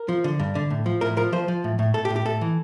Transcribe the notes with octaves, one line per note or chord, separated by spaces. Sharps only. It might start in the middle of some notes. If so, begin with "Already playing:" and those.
Already playing: A#4
F3
D3
G2
D3
A2
F3
A2 A#4
F3 A#4
F3 C5
F3
A2
A2
A2 A4
G4
A2
G4
A2 A4
E3